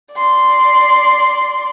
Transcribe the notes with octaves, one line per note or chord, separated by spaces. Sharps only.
D5 C6